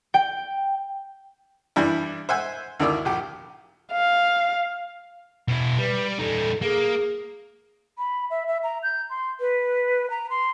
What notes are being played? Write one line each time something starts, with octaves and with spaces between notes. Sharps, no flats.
G5
G2 E3 G3 D4 E4
C5 E5 F#5 G#5 E6
D2 D#3 A#3 E4 D5 E6
A#1 G4
F5
B2 E4
G3 B4
G3 D#4 A4
A#3 G#4
B5
E5
E5
A#5
G6
C6
B4
A#5
C6